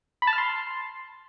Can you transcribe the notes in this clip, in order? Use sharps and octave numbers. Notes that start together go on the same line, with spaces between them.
B5
A5
F6
C6